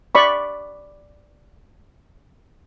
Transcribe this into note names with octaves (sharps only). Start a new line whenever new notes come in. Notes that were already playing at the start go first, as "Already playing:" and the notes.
D5 B5 C#6